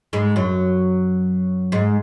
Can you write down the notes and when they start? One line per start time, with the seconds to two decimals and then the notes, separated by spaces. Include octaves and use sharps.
0.13 G#2 G#3
0.36 F#2 F#3
1.72 G#2 G#3